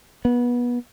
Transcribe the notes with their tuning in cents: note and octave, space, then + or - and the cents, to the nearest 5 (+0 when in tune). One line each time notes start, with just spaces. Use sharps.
B3 -25